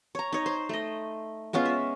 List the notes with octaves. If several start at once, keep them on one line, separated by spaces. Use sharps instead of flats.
C#5 A#5
D#4 C#5
C5
A3 D#5
G#3 B3 C#4 F4
E5